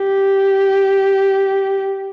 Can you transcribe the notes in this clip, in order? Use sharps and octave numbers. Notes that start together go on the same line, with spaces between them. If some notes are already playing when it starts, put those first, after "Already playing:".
Already playing: G4